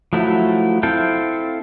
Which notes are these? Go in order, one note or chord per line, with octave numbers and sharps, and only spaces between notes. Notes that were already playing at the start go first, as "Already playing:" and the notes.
F3 F#3 A3 E4
C4 E4 A4 F5 G5